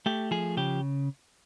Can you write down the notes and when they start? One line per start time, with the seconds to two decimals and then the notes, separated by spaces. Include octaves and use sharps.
0.06 A3 G4
0.31 F3 G#4
0.57 C#3 G4